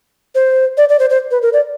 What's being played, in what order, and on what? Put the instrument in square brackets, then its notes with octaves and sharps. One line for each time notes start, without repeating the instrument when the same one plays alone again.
[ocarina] C5
D5
D5
C5
C5
B4
A#4
D5